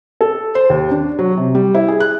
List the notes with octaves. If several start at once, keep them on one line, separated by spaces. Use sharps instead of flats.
A4
C5
D#2
D4
F#3
C3
G3
E4
G#4
F#6